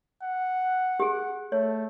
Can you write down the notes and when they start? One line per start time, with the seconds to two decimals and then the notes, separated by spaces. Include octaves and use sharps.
0.22 F#5
1.00 G4 G#4
1.52 A3 C#5